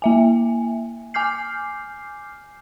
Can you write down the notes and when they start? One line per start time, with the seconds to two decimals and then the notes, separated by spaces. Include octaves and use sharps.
0.02 A#3 E5 G#5
1.14 G#5 D6 F6 G6 C7